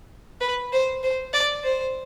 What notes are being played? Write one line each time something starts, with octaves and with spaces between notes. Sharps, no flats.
B4
C5
C5
D5
C5